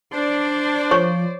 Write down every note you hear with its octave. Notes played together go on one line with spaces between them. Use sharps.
D4 C5 D5
F3 C#5 C#6